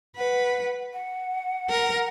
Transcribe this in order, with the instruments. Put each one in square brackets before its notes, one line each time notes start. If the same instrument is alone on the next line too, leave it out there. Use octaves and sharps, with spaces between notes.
[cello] B4 [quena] F#5
[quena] F#5
[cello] A#4